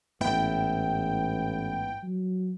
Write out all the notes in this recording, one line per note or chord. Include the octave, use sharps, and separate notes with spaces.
A1 G#2 B3 E4 G5
F#3